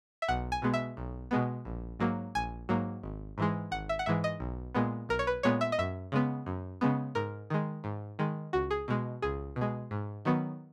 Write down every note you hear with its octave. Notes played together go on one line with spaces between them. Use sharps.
E5
B1 F#5
G#5
B2 G#3 B3
E5
B1
B2 G#3 B3
A#1
G#2 F#3 A#3
A#1 G#5
G#2 F#3 A#3
G#1
G#2 E3 G#3
G#1 F#5
E5
F#5
G#2 E3 G#3 E5
D#5
B1
A#2 G#3 B3
B1 A#4
C#5
B4
A#2 G#3 B3 C#5
E5
D#5
F#2 E5
C#3 G#3 B3
F#2
C#3 G#3 B3
G#2 A#4
D#3 G#3
G#2
D#3 G#3
C#2 F#4
G#4
B2 G#3
C#2 G#4
B2
G#3
G#2
D#3 F#3 B3